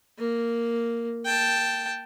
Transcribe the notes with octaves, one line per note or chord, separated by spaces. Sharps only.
A#3
G5 A5